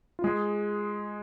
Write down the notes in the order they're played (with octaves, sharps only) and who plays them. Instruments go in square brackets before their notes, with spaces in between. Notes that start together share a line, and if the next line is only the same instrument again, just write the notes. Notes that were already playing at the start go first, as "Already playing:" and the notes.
[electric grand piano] F4
G#3 G#4